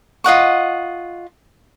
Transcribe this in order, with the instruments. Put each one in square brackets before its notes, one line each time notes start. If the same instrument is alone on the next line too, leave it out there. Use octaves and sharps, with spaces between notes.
[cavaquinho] F4 D#5 F#5 C#6